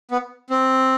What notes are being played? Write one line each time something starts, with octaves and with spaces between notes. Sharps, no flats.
B3
C4